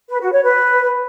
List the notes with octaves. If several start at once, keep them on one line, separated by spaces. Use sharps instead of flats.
B4
F#4
C#5
B4